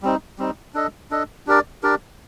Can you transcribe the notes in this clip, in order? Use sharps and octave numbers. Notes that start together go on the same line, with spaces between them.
G3 C4 D#4
G3 C4 D#4
D4 A4 D#5
D4 A4 D#5
D4 G4 A#4 D5
D4 G4 A#4 D5